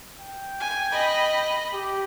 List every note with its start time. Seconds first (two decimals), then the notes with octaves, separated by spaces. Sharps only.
0.20 G5
0.60 G#5
0.92 D#5 B5
1.73 G4